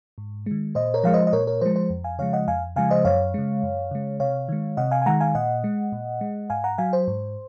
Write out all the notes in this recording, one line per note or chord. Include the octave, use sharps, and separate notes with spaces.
G#2
D#3 G#3
A#2 C5 D#5
A#4 C#5
F3 G#3 F5
C5 D#5
D#5
A#2 A#4 C#5
A#4 C#5
F3 G#3 C5
C5
F2
F5 G#5
C#3 F3 G#3 C#5 F5
D#5 F#5
F2 F5 G#5
C#3 F3 G#3 F5 G#5
C5 D#5
F#2 C#5 F5
C#3 G#3
F#2
C#3 G#3
C3 C#5 F5
D#3 G#3
C3 D#5 F#5
F5 G#5
G#5
D#3 G#3 F#5 A#5
F5 G#5
A#2 D#5 F#5
G#3
A#2
G#3
G#2 F5 G#5
F#5 A#5
F#3 F5 G#5
C5
G#2